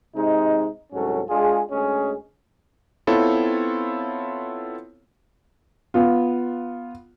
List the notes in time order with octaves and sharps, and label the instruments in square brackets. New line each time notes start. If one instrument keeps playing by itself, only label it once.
[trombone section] C3 G#3 D#4
C2 G#2 F#3 C#4 A4
G#3 D4 F4 G#4
D2 G#3 C#4 G#4
[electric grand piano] B3 C4 E4 F4 A4 C#5
[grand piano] B3 F4